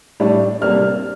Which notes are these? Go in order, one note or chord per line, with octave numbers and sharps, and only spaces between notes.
A2 G3 D4
C3 G3 A#3 D4 F6